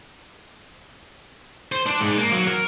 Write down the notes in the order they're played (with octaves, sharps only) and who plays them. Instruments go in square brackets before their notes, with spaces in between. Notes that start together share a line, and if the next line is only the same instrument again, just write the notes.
[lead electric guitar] C5
D4
G#2
A#3
F#3
A#4